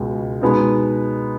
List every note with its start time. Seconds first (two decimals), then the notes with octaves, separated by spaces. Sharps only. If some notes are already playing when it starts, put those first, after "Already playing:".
Already playing: C#2 B2 G#3
0.41 B2 G#3 B3 D#4